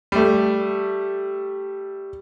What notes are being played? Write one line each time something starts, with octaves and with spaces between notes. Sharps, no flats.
G3 A3